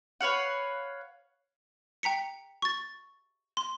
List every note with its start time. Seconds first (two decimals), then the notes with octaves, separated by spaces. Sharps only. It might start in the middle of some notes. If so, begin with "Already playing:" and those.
0.21 B4 C#5 F5 F#5
2.03 G5 A#5 B6 C#7
2.62 C#6 A6
3.57 C6